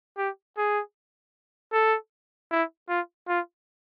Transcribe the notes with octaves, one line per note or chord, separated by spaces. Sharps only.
G4
G#4
A4
E4
F4
F4